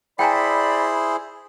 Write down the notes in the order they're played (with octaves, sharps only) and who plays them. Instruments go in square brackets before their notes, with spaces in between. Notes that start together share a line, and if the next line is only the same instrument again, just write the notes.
[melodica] E4 G#4 C5 [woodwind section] D5 B5 [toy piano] G5 G#5 A#5